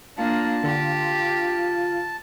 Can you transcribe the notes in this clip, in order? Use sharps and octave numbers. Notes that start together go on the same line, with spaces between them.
A#3 D4 F4 A5
D3 G4